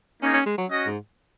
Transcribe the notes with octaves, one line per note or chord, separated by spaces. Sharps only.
A#3 C#4 D#4 G#4 C#5
C#4
G#3
F#3
C#4 F#4 D#5
G#2